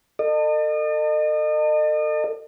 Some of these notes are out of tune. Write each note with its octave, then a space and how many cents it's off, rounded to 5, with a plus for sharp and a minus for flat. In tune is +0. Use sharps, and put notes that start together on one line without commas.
A4 +35 D#5 -35